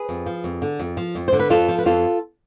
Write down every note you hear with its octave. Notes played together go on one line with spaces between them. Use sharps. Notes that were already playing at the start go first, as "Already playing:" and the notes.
Already playing: G#4 B4
F2
F3
F2
D3
F2
F3
F2
D3 C5
B4
F2 F4 A4
F3
B4
F2 F4 A4